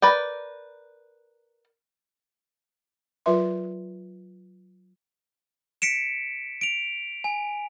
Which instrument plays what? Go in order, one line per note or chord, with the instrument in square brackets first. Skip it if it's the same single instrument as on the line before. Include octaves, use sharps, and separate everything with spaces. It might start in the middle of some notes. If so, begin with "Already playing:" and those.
[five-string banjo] A#4 B4 D5 G5
[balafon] F#3 F4 A#4 B4 E5 C6
[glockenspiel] B6 C#7 D7 E7
D7 F7
G#5